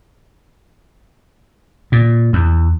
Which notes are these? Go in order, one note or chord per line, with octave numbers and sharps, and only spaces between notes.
A#2
E2